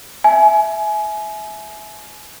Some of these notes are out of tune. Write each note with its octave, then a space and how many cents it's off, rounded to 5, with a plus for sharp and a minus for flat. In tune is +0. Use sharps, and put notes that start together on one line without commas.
E5 +0 G#5 +30